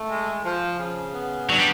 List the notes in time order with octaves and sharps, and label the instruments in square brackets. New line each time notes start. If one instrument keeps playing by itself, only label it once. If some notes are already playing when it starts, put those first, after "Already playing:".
Already playing: [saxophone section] A3
G#3
F3
C#3
B3
[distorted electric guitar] F#3 [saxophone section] D4
[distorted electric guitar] G3